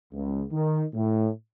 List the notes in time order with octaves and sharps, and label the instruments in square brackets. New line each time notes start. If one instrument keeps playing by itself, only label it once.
[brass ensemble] C#2
D#3
A2